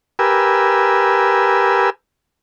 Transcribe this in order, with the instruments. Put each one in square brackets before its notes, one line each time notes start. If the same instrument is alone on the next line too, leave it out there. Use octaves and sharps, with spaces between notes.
[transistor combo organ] G4 A#4 B4 G#5 E6